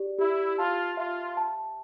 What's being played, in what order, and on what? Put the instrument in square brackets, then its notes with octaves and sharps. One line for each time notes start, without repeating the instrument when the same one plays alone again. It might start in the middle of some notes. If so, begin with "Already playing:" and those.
Already playing: [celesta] G4 D5
[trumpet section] E4 [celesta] G4
[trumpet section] F4 [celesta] A5
[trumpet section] F4 [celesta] E5
[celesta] A5